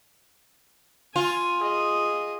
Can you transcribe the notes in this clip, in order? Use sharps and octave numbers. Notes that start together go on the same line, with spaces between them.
F4 G#5
G#4 D#5